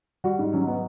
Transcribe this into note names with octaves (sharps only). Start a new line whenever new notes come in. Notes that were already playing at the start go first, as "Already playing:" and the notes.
G3 F#4
G#2
F#3 C#4
B3